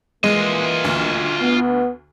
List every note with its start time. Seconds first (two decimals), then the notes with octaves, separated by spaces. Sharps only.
0.24 E3 G#3 A#3 F4 D#5
0.84 D2
1.41 B3